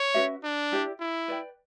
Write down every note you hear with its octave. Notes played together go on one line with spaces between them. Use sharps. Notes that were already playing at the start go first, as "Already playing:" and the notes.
Already playing: C#5
C#4 F#4 B4 E5
D4
E4 G4 D5
E4
B4 D5 G5